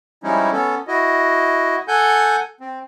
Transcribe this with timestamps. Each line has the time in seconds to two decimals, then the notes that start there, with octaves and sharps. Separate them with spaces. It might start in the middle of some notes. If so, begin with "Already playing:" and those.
0.24 F3 G3 G#3 C#4 D#4 E4
0.53 B3 C#4 A4
0.88 E4 F#4 D#5
1.88 A4 F#5 G#5 G6
2.61 C4